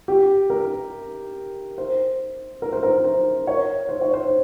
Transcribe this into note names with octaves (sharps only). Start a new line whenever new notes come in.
G4
A#4
C5
A#4
C5
A#4
C5
C#5
C5
C#5
C5